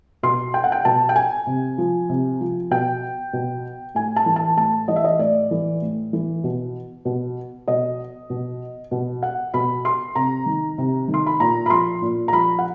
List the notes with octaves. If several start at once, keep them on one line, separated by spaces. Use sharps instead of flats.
B2 C6
G5
F#5
G5
B2 A5
G5
G#5
C3
F3
C3
F3
B2 G5
B2
A2 G#5
A5
E3
A5
A2 A5
E3 D#5
E5
D#5
A2 D5
E3
A2
E3
B2
B2
B2 D#5
B2
B2
F#5
B2 B5
C6
C3 A#5
D#3
C3
D#3
C6
B5
A#2 A#5
B5
F3 C6
A#2
A#5
F3 B5
F#5